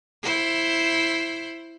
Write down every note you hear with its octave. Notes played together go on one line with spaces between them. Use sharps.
E4 C5